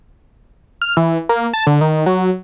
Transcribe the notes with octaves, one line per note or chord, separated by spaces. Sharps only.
F6
E3
A#3
A5
D3
D#3
F#3